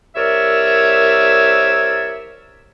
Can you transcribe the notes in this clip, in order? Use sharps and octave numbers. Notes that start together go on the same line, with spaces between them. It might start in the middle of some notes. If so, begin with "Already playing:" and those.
C2 A#4 C#5 D5 E5 E6